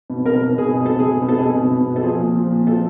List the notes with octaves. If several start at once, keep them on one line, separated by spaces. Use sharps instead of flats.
B2
B2 A#4
B2
B2 G#4
B2 G#4
B2 A4
G#4
B2
B2
A4
B2 G#4
B2
B2
B2
A4
F3 G#4
A#2
F3
A#2
F3 A4